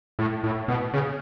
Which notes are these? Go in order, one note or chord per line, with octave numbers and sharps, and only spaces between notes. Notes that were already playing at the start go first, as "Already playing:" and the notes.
A2
A2
B2
C#3